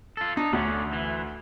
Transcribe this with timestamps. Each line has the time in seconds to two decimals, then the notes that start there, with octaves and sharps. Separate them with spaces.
0.17 F4 A4
0.37 D4 D#4
0.53 D2 D3 C#4
0.93 E3